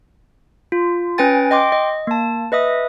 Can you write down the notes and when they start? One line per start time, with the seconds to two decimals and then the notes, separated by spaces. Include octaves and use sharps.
0.72 F4
1.18 C#4 B4 G5 G#5 A6
1.51 D#5 G5 C6 D6
1.72 D#5
2.07 A#3 A5
2.52 B4 D#5 E5 D#6